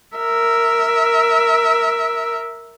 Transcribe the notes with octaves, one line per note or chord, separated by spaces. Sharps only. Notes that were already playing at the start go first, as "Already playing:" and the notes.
A#4 E5